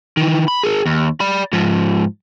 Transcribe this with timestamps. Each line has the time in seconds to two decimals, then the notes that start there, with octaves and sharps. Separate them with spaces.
0.17 D#3 E3
0.48 B5
0.63 G#4 A#4
0.86 D#2
1.20 D5 B5
1.53 G#2 F3